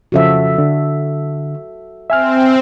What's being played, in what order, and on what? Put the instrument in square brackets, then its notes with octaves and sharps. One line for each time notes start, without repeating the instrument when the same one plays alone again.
[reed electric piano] F2 C#3 F3 [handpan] F#4 A4 E5
[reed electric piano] D3
[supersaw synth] C4 [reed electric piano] E5 G#5 F6